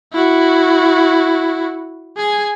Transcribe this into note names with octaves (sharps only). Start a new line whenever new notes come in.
E4 F#4
G#4 G#5